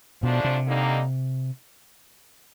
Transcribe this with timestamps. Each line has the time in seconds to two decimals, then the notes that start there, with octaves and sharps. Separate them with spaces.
0.22 G#2 B2 F3 A3 D4
0.44 C3
0.66 D#2 D3 G3 A#3 D#4